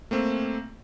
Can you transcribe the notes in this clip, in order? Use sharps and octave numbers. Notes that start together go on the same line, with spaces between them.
A3 A#3 C4